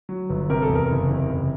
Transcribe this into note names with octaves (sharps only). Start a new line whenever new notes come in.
F#3
G1
C3 A#4
A4
E2
A#4
F#1
C3
F#1